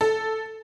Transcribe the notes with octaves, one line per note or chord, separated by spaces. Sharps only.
A4